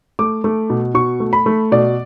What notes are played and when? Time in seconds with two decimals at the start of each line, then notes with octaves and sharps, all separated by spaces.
0.19 A3 D6
0.44 A3
0.70 B2
0.94 B2 C#6
1.20 A3
1.33 B5
1.46 A3
1.72 B2 D5